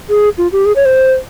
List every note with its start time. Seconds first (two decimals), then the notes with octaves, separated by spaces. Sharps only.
0.09 G#4
0.38 F4
0.52 G4
0.66 G#4
0.76 C#5
0.85 C5